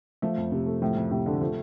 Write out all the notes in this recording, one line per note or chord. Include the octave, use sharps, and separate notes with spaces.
F3 A3
F2
C3
A3
A2 F3
F2
A2 C3
D3 A3
F3 A3